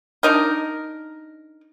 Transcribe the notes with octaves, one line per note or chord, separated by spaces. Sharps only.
D4 D#4 A#4